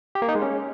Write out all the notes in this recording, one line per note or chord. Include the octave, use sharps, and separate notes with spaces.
G4
A#3
D#4
G#3
C#4